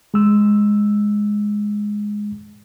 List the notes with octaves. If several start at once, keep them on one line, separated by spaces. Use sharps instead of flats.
G#3 E6